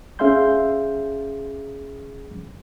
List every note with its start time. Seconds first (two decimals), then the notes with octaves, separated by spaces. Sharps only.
0.19 C#4 G#4 E5 F5 C6 G6